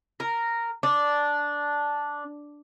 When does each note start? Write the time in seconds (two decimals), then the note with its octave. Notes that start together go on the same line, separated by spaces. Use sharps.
0.20 A#4
0.83 D4